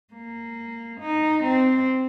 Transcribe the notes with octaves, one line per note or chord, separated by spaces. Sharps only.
A#3
D#4
C4